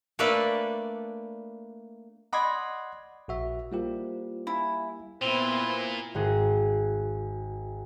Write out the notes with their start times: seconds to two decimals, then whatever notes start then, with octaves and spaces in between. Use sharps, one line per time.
0.19 A3 A#3 D4 A4 B4 D5
2.33 D5 D#5 F#5 B5 C6 G#6
3.28 A#1 F#4 E5
3.72 G3 A#3 E4 F4 G4 C5
4.47 E4 F5 G#5
5.22 A#2 B3 C4 E4 F7 G7
6.15 G#1 F#4 G#4 A#6